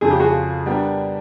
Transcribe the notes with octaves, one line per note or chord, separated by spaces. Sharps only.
F2 C#3 F3 G#4
G4
F#4 G#4
G3 B3 D4 G4 A#4